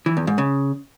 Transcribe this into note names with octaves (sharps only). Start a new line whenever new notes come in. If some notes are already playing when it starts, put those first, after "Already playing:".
E3
E2
G#2
C#3